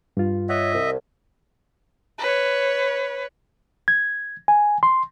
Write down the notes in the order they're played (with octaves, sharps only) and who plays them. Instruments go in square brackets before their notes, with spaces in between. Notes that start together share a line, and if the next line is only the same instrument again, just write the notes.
[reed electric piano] G2 F4
[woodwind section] C#5 F#5 [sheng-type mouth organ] D#5 E5
[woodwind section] C2
[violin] B4 C#5
[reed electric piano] G#6
G#5
C6